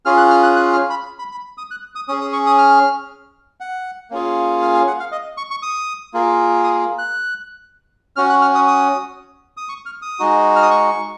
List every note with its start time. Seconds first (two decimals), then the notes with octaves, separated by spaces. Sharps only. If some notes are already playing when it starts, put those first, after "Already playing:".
0.05 C#4 F4 G#4 F6
0.17 F#6
0.31 F6
0.43 F#6
0.57 F#6
0.73 F6
0.90 B5
1.19 B5
1.32 B5
1.58 D#6
1.71 F#6
1.95 D#6
2.08 C#4 G#4 D#6
2.21 D#6
2.33 C#6
2.47 D#6
2.58 F6
3.60 F#5
4.10 A#3 C#4 F4 G#4
4.62 F5
4.74 F5
4.87 F#5
5.00 F5
5.12 D#5
5.37 C#6
5.51 C#6
5.63 D#6
6.14 A#3 F4 G#4
6.64 D#6
6.98 F#6
8.16 C#4 F#4 F6
8.30 F#6
8.42 F6
8.55 D#6
8.67 D#6
9.57 D#6
9.69 C#6
9.86 F6
10.02 D#6
10.19 G#3 D#4 F#4
10.56 F6
10.63 D#6
10.71 C#6